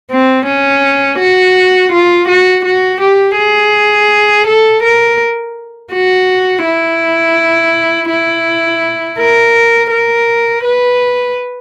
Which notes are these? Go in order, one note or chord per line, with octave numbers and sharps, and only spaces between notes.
C4
C#4
F#4
F4
F#4
F#4
G4
G#4
A4
A#4
F#4
E4
E4
A#4
A#4
B4